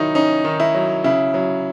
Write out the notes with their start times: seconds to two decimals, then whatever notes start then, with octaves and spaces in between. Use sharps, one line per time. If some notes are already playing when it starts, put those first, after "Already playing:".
Already playing: D#3 F#3 D#4 E4
0.15 C#4 D#4
0.45 D#3
0.60 E4
0.74 F#3
1.04 C#3 E4
1.34 F#3